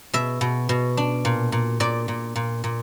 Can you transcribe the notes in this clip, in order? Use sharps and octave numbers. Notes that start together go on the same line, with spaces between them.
B2 E5
B2
B2
D4
A#2
A#2
A#2 D5
A#2
A#2
A#2